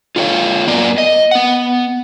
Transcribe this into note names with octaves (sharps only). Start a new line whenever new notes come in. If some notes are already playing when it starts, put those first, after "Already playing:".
F4 A4 A#4 C#5 F5
F#2 A#3 B3 F4 D5 A#5
D#5
B3 F#5